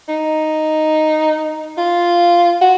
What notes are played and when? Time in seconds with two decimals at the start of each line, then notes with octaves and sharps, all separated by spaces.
0.08 D#4
1.77 F4
2.61 F#4